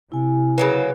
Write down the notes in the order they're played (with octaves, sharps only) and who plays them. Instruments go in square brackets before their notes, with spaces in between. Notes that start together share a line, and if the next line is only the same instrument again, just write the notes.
[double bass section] C3 [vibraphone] E4 G#5
[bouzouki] C#3 F#3 A#3 [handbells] B4